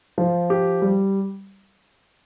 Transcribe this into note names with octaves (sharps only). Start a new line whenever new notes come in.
F3
G4
G3